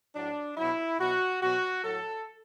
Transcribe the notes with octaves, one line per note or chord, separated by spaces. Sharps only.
A2 F#3 D4
B2 F#3 E4
B2 F#3 F#4
B2 F#3 F#4
A2 F#3 A4